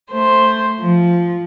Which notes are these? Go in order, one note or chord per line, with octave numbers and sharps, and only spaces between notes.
A3 C5
F3